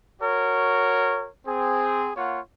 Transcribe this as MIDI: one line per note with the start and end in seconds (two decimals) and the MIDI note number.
0.21 1.28 66
0.21 1.28 70
0.21 1.28 73
1.46 2.10 60
1.46 2.10 68
2.16 2.39 58
2.16 2.39 65
2.16 2.39 73
2.16 2.39 78